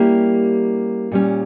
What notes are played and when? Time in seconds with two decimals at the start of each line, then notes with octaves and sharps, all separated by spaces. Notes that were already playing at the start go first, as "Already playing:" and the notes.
Already playing: G3 A#3 C#4 E4 G4
1.12 A#2 G3 C#4